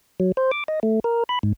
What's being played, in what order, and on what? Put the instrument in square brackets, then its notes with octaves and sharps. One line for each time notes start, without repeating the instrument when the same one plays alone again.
[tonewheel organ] F#3
C5
D6
D#5
A3
A#4
B5
G#2